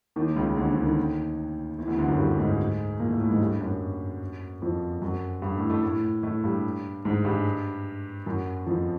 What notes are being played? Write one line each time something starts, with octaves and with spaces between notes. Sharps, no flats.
D#2 D#3
C#2 C#3
D2 D3
D2 D3
D#2 D#3
E2 E3
D2 D3
D2 D3
F#2 F#3
G2 G3
G#2 G#3
A#2 A#3
A2 A3
A2 A3
G#2 G#3
G2 G3
F#2 F#3
F2 F3
F#2 F#3
G2 G3
A2 A3
A2 A3
A2 A3
A2 A3
G2 G3
G#2 G#3
G2 G3
F#2 F#3
F2 F3